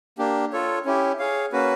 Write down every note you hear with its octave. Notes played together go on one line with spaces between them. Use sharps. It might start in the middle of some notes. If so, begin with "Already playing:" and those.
A#3 D4 G4
F4 A4 C#5
C#4 E4 G4
G#4 C#5 F5
A#3 C#4 F#4 B4